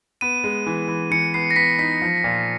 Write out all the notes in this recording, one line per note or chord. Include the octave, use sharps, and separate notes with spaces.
B3 D#7
G#3
E3
E3
E3 C#7
B3 C7
A#6
B3 B6
D#4 B6
F3
A#2